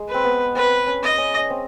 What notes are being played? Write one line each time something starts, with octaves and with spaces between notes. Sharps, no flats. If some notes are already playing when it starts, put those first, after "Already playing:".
Already playing: G#3
B4
C4
B3
C4 B4
C#4
D#5
C#4
C#4
C4